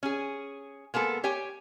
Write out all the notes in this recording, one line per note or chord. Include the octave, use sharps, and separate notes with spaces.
C#4 G#4
G#3 A#3 B3 A4
G4 C#5 G5 G#5